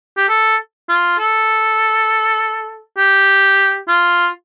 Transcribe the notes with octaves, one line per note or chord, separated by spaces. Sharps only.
G4
A4
F4
A4
G4
F4